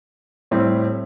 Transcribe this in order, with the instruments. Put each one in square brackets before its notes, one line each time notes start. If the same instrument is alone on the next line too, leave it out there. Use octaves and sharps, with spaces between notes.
[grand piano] A2 G3 C4 E4 G4